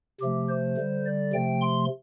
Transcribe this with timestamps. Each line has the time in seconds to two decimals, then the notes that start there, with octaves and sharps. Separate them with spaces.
0.21 C3 F3 A3 G4
0.49 C5
0.77 D3 G3
1.06 D5
1.33 C3 F3 A3 G5
1.61 C6